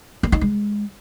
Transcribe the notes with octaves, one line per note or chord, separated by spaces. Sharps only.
A#3
D#4
G#3